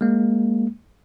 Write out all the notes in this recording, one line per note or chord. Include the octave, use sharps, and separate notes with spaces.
G#3 A#3